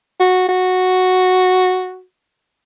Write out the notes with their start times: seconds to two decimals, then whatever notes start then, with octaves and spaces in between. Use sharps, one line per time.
0.20 F#4
0.49 F#4